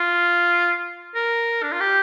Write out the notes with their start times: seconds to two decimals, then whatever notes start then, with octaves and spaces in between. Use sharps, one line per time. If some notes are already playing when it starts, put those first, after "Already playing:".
Already playing: F4
1.15 A#4
1.63 D4
1.72 F4
1.80 G4